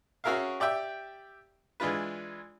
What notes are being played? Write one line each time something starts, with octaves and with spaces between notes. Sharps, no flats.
C#4 F#4 G#4 A#4 E5 F5
G4 D5 E5 G5
E3 G#3 D4 F4 B4